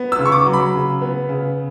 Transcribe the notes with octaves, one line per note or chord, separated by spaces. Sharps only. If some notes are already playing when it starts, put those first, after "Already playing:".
Already playing: B3
E6
C#3
C#6
D6
F#3
B5
C#3
B3
C#3